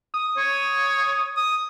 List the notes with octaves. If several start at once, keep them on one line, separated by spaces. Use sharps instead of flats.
D#6
C#5
D#6